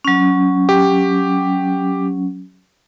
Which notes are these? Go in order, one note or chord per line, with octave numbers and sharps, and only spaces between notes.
F#3 C#4
G4